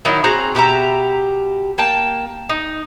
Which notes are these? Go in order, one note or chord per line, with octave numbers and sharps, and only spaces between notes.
D#3 F#3 D#4 E4
C4 F#4 G#4 A#5
B2 G4 E5 A#5
A#3 G5 A5
D#4